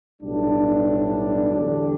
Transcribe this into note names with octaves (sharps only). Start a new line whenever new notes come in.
B1 A2 G3 D4
E2 D3 G3 D4